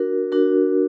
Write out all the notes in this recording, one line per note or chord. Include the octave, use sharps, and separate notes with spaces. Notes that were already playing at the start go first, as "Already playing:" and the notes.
Already playing: D4 F#4 A#4
D4 F#4 A#4